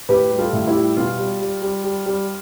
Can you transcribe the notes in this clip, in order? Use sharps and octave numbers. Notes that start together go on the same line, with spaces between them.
A2 G4 B4
G3
F4 A4
A2
E4 G4
G3
B2 F4
G3
G3
G3
G3
G3